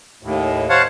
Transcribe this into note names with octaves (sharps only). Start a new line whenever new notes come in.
D#2 A2
C5 C#5 F5 F#5 A5